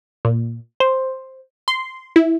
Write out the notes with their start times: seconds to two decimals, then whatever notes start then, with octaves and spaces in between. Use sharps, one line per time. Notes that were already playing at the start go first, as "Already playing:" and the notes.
0.25 A#2
0.80 C5
1.68 C6
2.16 E4